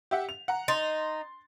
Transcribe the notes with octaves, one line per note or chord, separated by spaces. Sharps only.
G4 E5 F#5
F7
F#5 A#5
D#4 C6 A6